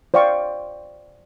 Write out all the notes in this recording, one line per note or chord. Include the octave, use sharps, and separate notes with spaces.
C5 D5 F5 G5 C#6